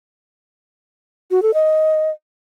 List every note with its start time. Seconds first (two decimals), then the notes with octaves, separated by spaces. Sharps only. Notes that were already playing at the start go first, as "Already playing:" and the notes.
1.31 F#4
1.42 A4
1.54 D#5